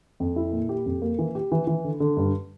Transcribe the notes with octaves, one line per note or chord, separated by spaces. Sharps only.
F2
E4
A#2
G4
F2
A#3
E3
G4
E3
E3
D3
D3
G2